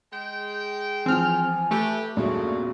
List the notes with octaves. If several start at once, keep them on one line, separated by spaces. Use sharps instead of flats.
G#3 G5
E3 F3 C4 G#5 F6
A3 G4 B4
E2 G2 A#2 C#3 F#4